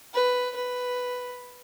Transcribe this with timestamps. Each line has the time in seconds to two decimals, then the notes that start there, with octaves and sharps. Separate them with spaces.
0.14 B4
0.55 B4